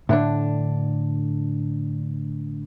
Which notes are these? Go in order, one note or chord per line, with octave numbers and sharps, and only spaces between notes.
A2 D3 D4